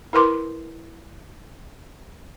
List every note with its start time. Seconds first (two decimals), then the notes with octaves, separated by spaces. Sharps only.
0.13 E4 A#4 B4 C6 D6